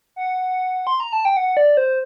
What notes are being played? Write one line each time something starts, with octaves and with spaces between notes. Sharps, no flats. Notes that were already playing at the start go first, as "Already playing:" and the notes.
F#5
C6
A#5
A5
G5
F#5
D5
C5